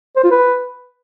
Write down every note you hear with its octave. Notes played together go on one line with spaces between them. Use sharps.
C5
F4
B4